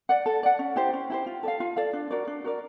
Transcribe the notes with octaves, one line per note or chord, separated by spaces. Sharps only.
D5 F#5
A4
D5 F#5
C#4
E4 G4 C5
C#4
E4 G4 C5
F4
A4 D5 F5
F4
A4 D5 F5
D4
F#4 A#4 D5
D4
F#4 A#4 D5